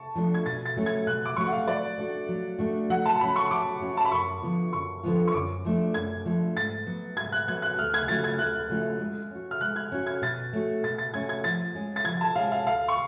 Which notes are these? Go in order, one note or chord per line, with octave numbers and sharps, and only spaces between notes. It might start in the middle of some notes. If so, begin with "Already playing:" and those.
Already playing: A5 C#6
F3 A3 D4
G#6
B2 A6
A6
F#3 A3 C#4 F#4
G#6
B2 F#6
D6
F#3 A3 C#4 F#4 C#6
F#5
F5
F#3 D5
A3 D4 F#4
F#3
A3 D4 F#4
F#3 F#5
A5
A5
C#4 F#4 B5
C#6
F#3 D6
C#4 F#4
A5
B5
F#2 C#6
D3 F3 B3 F4
F#2 C#6
D3 F3 B3 F4
C#6
F#2 D6
F3 A3 D4
F#2 G#6
F3 A3 D4
G#2 A6
F#3 B3 F#4
G#2 G#6
F#6
F#3 B3 F#4 G#6
F#6
D2 F6
G#6
C#3 F#3 A3 F4 A6
G#6
D2 F#6
C#3 F#3 A3 F4
G#3
C#4 F#4
F6
G#3 F#6
G#6
C#4 F#4
G#6
B2 A6
A3 C#4 F#4
B2 A6
A6
A3 C#4 F#4 G#6
G#6
F3 A6
G#3 C#4 G#4
A6
F3 G#6
A5
G#3 C#4 G#4 F5
F5
D2 F5
C#6